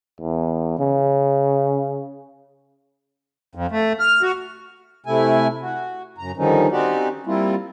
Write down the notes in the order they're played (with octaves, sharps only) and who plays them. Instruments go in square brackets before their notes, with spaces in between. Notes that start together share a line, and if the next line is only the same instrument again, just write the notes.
[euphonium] E2
C#3
[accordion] F2
A3
F6
F#4
[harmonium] C3 A3 E4 G#5
F#4
F#2 C#3 A#5
D3 D#3 F3 G3 C#4 D#4
C4 C#4 D#4 F#4 G4 D5
G3 A#3 C4 E4 F4